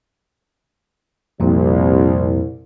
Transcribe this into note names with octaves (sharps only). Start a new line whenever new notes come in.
C2 F2 A#2